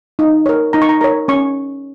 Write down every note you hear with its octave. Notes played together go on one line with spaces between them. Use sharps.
D#4
A#4 C#5
D#4 A#5
C#6
A#5
A#4 C#5 A#5
C#4 C#6